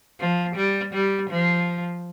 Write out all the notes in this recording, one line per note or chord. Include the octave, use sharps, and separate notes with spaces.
F3
G3
G3
F3